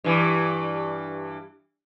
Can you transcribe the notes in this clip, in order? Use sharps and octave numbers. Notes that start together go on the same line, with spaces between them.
G2 E3